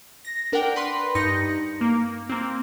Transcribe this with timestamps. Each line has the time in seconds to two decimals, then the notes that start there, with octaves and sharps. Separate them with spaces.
0.25 A#6
0.52 D4 A#4 D5 F#5 G5
0.76 B4 B5 C6
1.15 G2 D#4 G6 A#6 C#7
1.81 A#3
2.30 A#3 C4